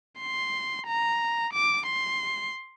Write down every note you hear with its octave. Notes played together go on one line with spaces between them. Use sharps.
C6
A#5
D6
C6